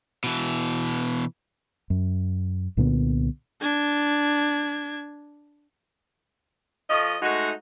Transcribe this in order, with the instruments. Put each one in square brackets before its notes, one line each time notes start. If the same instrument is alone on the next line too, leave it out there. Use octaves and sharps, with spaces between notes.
[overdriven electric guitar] B2 E3
[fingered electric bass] F#2
C2 A#2 D3 B3
[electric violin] D4 G#6
[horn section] F3 A4 C#5 D#5
G#3 A3 D#4 F#4